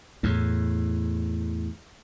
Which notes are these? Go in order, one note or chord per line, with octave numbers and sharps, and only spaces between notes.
E2 A2